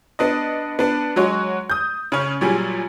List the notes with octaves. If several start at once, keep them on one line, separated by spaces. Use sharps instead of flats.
B3 D4 D#5
B3 D4
F#3 G#3 F#4 C#5
D#6 G6
C#3 C#4
A#2 F#3 G3 G#4